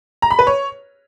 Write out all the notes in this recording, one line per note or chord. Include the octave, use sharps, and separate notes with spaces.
A#5
B5
B4
C#5